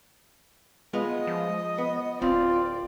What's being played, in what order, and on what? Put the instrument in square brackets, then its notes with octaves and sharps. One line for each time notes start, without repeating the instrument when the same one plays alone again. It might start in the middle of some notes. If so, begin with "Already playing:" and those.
[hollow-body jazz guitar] G#3 B3 F4 [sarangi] D#5
[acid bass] F3
[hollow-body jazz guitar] B3
[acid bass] D1 [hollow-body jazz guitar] C4 [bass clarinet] F4 [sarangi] D5